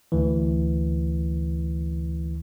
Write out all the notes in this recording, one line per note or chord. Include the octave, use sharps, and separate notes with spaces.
D2 E3